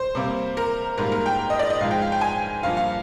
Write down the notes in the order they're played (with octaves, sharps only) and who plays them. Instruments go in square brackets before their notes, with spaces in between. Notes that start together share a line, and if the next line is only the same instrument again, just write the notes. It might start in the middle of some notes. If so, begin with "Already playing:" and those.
Already playing: [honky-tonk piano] C5
C3 G3 A#3
A#4
G#2 G3 A#3 A#4
A#4
G5
D#5
D5
D#5
G#2 F3 G#3 F5
G5
F5
G5
G#5
G2 F3 A#3 F5
F5